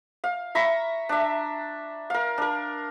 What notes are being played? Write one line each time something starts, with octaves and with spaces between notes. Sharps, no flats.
F5
E5 A#5 B5 C#6
D4 E5
A#4 F5
D4 A#4